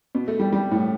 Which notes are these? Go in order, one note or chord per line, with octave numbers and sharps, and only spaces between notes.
B2
A3
G3
G3
A2